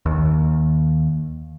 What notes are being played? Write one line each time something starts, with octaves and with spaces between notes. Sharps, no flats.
D#2